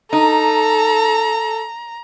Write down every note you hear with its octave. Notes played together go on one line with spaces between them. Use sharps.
D#4 A4 A#5